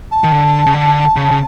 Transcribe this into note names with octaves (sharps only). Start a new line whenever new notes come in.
A5
D#3
D3
C#3
D3
C#3
C#3